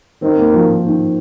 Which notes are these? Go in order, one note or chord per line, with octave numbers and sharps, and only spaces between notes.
D#3 C4
A#3
F3
D#3